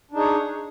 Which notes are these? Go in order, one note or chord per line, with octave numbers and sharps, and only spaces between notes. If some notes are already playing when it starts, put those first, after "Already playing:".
D4 D#4 G#4 C#5